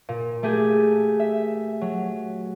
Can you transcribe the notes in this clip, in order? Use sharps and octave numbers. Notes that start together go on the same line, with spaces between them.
A#2
A3 G4 G#4
E5
F#3